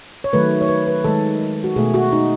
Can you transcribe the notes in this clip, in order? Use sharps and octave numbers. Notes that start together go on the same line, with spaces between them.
C#5
D#3 F#3 A3 B4
C#5
B4
B4
D#3 G#3 A4
F#4
B2 A3 G#4
F#4
D#4